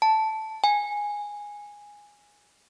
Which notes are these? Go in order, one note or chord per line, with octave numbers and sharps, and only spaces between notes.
A5
G#5